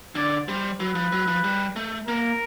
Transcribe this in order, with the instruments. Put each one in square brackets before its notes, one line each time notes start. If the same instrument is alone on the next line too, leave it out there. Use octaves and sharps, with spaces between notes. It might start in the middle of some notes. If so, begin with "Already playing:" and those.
[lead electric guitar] D3 [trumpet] D5
[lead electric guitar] G3 [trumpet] C5
[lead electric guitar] F#3 [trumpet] B4
[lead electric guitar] F3
F#3
F3
G3
A3
[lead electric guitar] A#3 [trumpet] A#4